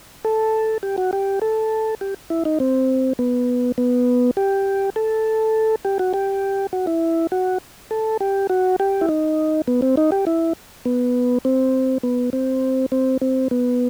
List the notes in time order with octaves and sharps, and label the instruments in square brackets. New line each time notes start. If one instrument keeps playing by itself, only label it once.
[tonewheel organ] A4
G4
F#4
G4
A4
G4
E4
D#4
C4
B3
B3
G4
A4
G4
F#4
G4
F#4
E4
F#4
A4
G4
F#4
G4
E4
D#4
B3
C4
D#4
G4
E4
B3
C4
B3
C4
C4
C4
B3